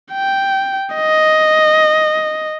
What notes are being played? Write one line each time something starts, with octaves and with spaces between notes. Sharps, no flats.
G5
D#5